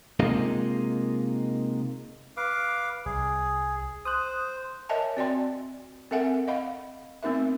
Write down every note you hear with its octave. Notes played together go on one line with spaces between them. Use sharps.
C3 G#3 A#3 D#4 F4
B4 F5 D6
C2 G#4
C5 D#6 F#6
A#4 C#5 D#5 E5 G#5 A5
C4 F#4 D5 G5 G#5 C6
C4 A4 A#4 E5 F#5 G#5
D#5 F5 F#5 B5
A3 B3 C4 D#4 A#4 E5